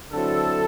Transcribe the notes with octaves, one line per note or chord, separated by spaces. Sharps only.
D3 F#3 C4 E4 A4